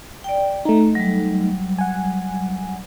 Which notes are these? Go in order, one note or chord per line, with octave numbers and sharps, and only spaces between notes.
D5 G5
A3 D#4 A#5
F#3 G3
F#5 G#5